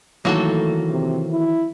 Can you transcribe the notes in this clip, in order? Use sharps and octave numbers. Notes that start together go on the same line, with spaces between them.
D#3 E3 F#3 A3 A#3 F#4 A4
C3
E4